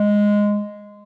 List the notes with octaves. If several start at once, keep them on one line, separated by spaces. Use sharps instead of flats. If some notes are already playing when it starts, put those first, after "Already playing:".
Already playing: G#3